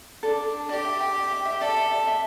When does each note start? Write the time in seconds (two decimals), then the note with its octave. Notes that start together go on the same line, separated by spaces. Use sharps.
0.23 D4 A4
0.69 G4 D5
0.85 E5
1.00 G5
1.16 E5
1.31 E5
1.45 E5
1.61 A4 D5
1.77 E5
1.91 D5
2.07 E5